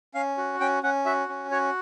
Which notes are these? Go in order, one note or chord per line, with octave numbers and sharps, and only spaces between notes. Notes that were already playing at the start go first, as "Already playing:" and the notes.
C#4 F5
F#4
C#4 G5
C#4 F#5
F#4 E5
C#4
F#4 C#5